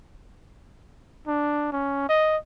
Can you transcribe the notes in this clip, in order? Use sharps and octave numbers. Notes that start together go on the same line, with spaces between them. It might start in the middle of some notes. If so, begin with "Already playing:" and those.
D4
C#4
D#5